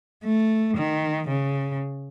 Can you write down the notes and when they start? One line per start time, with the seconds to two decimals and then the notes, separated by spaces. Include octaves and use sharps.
0.24 A3
0.77 D#3
1.28 C#3